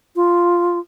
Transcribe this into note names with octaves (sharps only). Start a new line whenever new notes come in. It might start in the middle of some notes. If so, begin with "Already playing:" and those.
F4